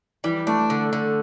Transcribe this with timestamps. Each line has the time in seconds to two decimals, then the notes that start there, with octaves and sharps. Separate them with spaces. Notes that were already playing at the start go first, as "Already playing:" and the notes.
0.24 E3 G3
0.47 A3 D4
0.70 D3
0.93 D3